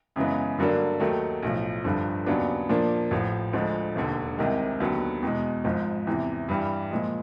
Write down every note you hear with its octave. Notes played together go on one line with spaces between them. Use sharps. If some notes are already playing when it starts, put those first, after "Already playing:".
F#2 C#3 E3 G#3 B3
G2 D3 F#3 A#3 D4
D#2 D#3 F#3 A3
B1 A2 F3
G1 G2 D3 F3
D#2 C#3 F#3 B3 D4
A#2 F3 A#3 D4
A1 A2 F3
D2 D3 F3 G#3
E1 D#2 D3
C2 C3 D#3 G#3
D#2 D3 F#3 B3
E2 B2 G#3
G#1 G#2 F3
E2 C3 E3
G2 E3 G3
A#2 F3 G#3